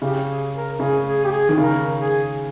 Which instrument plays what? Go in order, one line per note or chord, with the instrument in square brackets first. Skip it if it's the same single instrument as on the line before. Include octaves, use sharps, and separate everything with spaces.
[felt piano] C#3 [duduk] G4
[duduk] G#4
A#4
[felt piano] C#3 [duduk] G#4
[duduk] G#4
G4
G#4
[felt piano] D#3
[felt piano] C#3 [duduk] A#4
[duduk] G#4